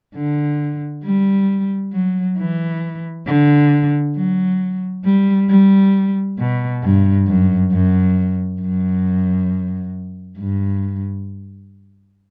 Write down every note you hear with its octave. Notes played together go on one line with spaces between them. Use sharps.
D3
G3
F#3
E3
D3
F#3
G3
G3
B2
G2
F#2
F#2
F#2
G2